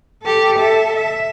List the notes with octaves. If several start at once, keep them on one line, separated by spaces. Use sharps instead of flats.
G4 A4
A4 E5
E5